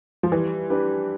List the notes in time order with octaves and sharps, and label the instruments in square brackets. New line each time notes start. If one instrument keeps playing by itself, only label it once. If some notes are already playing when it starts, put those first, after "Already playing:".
[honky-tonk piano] F3
[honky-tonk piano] E3 [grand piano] G3
[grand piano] D4 G4 B4